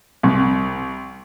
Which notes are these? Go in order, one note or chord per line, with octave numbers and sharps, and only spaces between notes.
C2